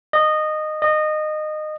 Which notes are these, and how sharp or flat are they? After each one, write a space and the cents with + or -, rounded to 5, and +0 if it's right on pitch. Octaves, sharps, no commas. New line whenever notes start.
D#5 -15
D#5 -20